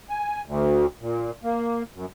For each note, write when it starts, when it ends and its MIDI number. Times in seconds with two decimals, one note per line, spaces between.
0.09 0.42 80
0.46 0.86 38
1.01 1.31 46
1.43 1.83 58
1.95 2.06 42